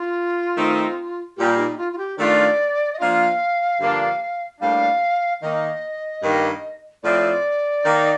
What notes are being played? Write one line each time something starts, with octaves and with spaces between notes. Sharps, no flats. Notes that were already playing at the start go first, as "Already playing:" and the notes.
Already playing: F4
D#3 A3 C4 D#4
A#2 G3 A#3 G4
D#4
F4
F4
G4
D#3 A3 D4 F4 D5
D#5
F3 A#3 D4 F4 F5
G2 D3 F3 A#3 D4
A2 G3 A#3 D4 F5
D#3 A#3 D#4 D#5
G2 D#3 A#3
A2 F3 A3 C4 D5
D#3 A#3 D#4